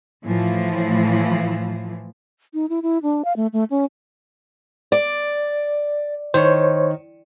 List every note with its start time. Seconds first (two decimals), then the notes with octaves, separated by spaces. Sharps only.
0.24 A2 E3 F3
2.54 D#4
2.70 E4
2.83 E4
3.03 D4
3.25 F5
3.36 A3
3.53 A3
3.70 C#4
4.92 D5
6.34 D#3 C5 C#5